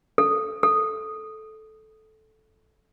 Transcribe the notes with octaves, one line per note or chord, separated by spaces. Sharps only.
A4
A4